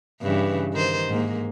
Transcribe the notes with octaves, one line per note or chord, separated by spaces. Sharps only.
G2 C#3 E3
D#3 C5
G#2 A#3